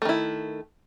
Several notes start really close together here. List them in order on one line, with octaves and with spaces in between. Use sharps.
A3 D#3 E4